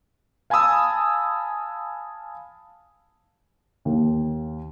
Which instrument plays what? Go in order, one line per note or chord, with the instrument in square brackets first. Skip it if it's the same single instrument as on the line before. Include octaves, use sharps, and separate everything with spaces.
[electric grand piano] F5 G#5 A5 B5 D#6 E6
[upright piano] D#2